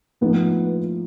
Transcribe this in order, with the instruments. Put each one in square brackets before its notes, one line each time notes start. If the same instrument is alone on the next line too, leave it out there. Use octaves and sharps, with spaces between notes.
[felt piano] A2 F3 A#3 D#4 [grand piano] B3